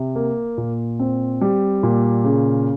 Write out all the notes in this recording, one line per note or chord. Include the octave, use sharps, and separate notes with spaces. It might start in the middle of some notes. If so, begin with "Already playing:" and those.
Already playing: C3
A#3
A#2
C4
G3
A#2
C#3